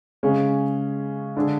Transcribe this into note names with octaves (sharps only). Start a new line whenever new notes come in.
C#3 G#3 C#4
D3 G#3 D4 G#4